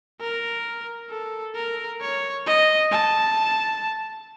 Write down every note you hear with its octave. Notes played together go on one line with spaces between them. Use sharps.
A#4
A4
A#4
C#5
D#5
A5